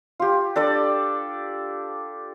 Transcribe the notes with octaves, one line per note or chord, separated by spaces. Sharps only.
F4 G4
D4 A4 D5